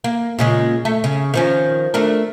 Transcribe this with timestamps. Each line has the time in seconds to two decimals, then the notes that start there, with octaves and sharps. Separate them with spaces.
0.04 A#3
0.39 A#2 C#3 G#3
0.85 A3
1.04 C#3
1.34 D#3 F3 C#4
1.94 A3 D4 A#4